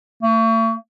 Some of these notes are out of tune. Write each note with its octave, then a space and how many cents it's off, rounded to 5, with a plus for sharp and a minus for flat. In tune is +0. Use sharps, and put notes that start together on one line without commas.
A3 +40